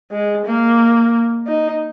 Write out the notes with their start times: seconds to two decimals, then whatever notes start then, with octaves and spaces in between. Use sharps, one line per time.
0.11 G#3
0.46 A#3
1.47 D#4